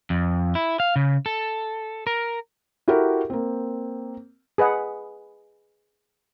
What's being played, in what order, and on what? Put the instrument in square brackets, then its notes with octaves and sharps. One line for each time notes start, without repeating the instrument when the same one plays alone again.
[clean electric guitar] F2
E4
F5
C#3
A4
A#4
[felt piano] E4 F#4 G4 A4 A#4
A#3 C4
[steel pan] G#4 B4 D#5 F#5